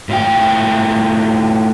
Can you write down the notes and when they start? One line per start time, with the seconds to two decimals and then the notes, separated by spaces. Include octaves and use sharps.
0.09 A2 F4 G5